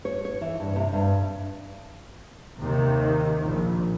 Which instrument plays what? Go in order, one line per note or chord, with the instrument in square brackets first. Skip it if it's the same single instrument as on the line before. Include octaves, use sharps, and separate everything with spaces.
[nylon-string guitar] C#5
C#5
E3
G2
C3
G2
[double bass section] D#2 C3 D#3
A#1